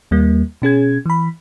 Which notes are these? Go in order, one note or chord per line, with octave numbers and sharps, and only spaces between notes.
D#2 G3 A#3
B2 C#4 G#4 G#6
E3 B5